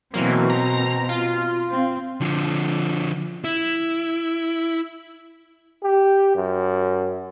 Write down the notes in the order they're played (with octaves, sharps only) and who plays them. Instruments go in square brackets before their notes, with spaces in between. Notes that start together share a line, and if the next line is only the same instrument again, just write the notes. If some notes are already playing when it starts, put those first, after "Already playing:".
[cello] B2 C4 [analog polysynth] E3 F#3 A#3
[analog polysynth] A#5
F4
[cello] C4
[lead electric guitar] D3 F3
E4
[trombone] G4
F#2